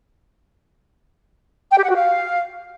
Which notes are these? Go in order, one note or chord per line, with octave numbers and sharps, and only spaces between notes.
G5
G4
F#5
F#4
F5